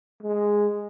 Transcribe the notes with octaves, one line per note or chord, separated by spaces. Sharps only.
G#3